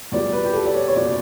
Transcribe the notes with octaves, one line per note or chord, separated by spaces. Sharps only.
E2 B2 G3 D5
B4
G4
A4
D5
C#5
C#5
F#1 B2 D5